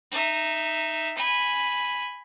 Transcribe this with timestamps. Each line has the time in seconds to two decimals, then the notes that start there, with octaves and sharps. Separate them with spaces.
0.11 D#4 E5
1.17 G#5 B5